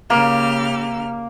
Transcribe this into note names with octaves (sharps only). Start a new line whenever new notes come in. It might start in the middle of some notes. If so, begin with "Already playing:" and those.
C#3 A#3 G4 F6